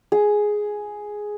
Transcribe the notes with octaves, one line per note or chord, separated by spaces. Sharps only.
G#4